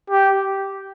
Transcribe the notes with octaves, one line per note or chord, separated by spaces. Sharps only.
G4